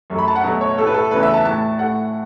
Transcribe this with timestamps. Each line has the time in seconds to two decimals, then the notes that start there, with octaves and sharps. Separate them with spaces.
0.10 F#2 F#3 A3
0.18 B5
0.28 A5
0.35 F#5
0.44 B2 F#3 A3
0.61 C#5
0.77 A2 A3 A4
0.86 B4
0.94 A4
1.11 E2 C#3 A3 B4
1.23 E5
1.34 A5
1.45 A2 A3 A5
1.79 A2 A3 F#5